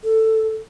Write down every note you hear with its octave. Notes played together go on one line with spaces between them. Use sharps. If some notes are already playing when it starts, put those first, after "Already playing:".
A4